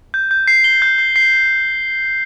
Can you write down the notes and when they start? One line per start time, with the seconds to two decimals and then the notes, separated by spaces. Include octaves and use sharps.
0.14 G6
0.31 G6
0.48 C7
0.64 G7
0.82 G6
0.98 C7
1.16 C7